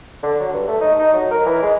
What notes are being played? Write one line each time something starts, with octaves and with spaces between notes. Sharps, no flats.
D3
F#3
G2
A3
D#4
D#4
F#3
A#4
E3
G#3